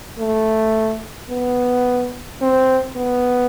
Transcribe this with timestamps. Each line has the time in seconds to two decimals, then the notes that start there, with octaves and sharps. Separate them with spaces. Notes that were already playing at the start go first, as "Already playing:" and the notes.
0.19 A3
1.30 B3
2.41 C4
2.96 B3